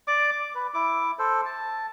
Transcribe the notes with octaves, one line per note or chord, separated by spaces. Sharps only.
D5 D6
D6
B4
E4 D6
A4 C5
A5